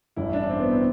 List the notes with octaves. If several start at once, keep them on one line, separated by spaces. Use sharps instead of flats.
A1 G2 E3 E4
D4
D4
C4
B3
C4